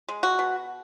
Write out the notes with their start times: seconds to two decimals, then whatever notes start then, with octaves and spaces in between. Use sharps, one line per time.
0.09 G#3
0.23 F#4
0.39 B2